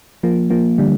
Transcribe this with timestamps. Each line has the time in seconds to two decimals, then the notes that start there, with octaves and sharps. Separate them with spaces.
0.23 F3 A#3
0.50 F3 A#3
0.78 D3 G3